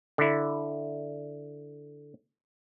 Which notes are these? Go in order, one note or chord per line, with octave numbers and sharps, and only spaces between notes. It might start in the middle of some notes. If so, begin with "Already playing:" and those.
D3 E4